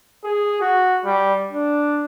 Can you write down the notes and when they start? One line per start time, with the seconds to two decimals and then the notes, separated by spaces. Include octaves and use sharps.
0.24 G#4
0.61 F#4
1.05 G3
1.51 D4